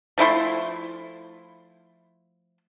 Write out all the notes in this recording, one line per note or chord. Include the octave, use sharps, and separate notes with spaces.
F3 A3 E4 C6